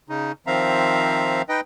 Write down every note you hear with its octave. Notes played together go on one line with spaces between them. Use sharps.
C#3 D#4
D#3 F3 C4 E5 F5 A#5
D#4 B4 D#5 G5